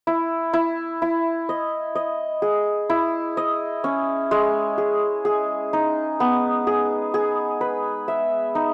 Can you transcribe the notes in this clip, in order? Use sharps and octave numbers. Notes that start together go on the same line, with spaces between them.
E4
E4
E4
D#5
D#5
G#4
E4
D#5
C#4
G#3
G#4
G#4
D#4
B3
G#4
G#4
B4
E5
D#4